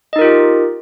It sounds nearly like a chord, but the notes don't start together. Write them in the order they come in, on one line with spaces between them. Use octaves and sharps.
D#5 D#4 A#4 F4 G4